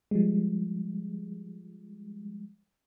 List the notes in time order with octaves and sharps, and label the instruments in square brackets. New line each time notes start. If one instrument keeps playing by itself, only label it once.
[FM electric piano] F3 G3 G#3